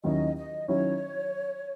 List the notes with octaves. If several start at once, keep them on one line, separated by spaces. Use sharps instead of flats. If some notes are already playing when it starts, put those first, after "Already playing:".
D#2 D#3 F#3 C#4 E4 D#5
D#5
D#3 F#3 C#4 E4 C#5